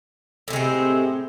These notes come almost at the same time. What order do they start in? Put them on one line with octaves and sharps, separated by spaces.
A2 C3 G#3 C4